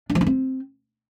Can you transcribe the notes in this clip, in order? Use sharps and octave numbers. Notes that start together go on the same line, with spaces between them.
D4
F3
D4
C4